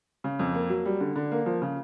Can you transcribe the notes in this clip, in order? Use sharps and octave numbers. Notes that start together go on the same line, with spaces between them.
C#3
F2
A#3
F#3
G3
D3
D3
A#3
F3
C#3